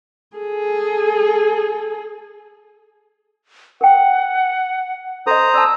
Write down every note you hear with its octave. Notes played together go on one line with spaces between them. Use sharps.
G#4 A4
A#4 F#5 G5
A4 C5 D#5 A#5 D#6
D5 A5 E6